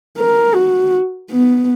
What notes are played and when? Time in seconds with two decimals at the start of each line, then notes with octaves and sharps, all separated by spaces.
0.18 A#4
0.55 F#4
1.30 B3